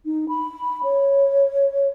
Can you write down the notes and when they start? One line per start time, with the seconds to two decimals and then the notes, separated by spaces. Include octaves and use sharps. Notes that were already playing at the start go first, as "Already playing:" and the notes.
0.05 D#4
0.29 B5
0.83 C#5